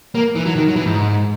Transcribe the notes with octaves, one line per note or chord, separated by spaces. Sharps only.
A#3
E3
F#3
D#3
F#3
E3
G#2